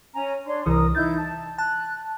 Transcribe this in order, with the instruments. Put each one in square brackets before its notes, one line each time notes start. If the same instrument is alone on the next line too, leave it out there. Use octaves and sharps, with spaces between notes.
[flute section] C#4 G#5 A#5
D4 C#5 C6
[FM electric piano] C2 E3 [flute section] A#4 D#6
[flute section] D#4 E4 G6 [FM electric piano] A6
[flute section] A5
[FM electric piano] A5 [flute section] F#6